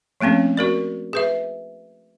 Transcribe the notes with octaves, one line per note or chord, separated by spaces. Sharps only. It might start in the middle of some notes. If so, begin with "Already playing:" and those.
F3 A3 A#3 C4 C#4
F#4 A#4 D5
G#4 B4 E5